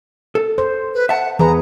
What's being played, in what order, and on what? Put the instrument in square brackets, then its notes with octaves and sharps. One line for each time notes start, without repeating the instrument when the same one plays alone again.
[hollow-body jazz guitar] A4
[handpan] C5
[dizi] B4
[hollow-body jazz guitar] E5 A5 [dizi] F#5
[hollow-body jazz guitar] E2 [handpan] E3 G#4 B4 [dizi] A#5